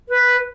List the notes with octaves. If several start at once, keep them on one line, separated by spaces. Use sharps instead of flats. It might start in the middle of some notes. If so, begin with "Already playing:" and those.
B4